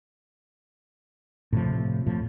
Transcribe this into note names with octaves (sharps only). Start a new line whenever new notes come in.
A2 C3 F3
A2 F3